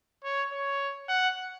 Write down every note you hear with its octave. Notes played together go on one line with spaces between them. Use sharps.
C#5
C#5
F#5